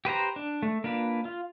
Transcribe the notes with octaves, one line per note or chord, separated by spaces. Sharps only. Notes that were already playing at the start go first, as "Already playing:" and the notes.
G4 B4 C5 A#5
D4
A3
A#3 D4 F4 B4
F4